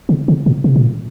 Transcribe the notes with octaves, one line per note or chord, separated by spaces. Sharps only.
C#3
C#3
A#2
C3
A#2